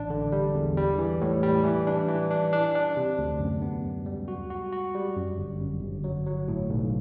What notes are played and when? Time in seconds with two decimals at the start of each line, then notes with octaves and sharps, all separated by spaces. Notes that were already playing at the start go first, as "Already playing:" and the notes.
Already playing: A1 D4
0.10 D3
0.32 G3
0.55 E2
0.77 G3
0.98 E3
1.21 A2
1.43 G3
1.64 E3
1.87 D4
2.08 E3
2.30 D4
2.53 D4
2.75 D4
2.97 C3
3.18 D2
3.40 F#2
3.62 B3
3.84 F#2
4.06 G3
4.28 F#4
4.50 F#4
4.72 F#4
4.94 G3
5.16 F#2
5.38 G1
5.60 F#2
5.82 G1
6.04 F#3
6.26 F#3
6.48 A2
6.70 B1